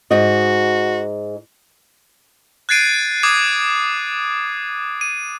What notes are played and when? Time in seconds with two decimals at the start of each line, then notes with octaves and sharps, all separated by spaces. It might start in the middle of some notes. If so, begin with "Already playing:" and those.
0.11 G#2 F#4 D#5
2.69 F#6 G#6 A6 C7 D7 D#7
3.23 D6 D#6 G#6 C7
5.01 D#7